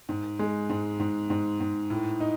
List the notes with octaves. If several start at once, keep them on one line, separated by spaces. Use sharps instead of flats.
G#2
G#3
G#2
G#2
G#2
G#2
A2
D#4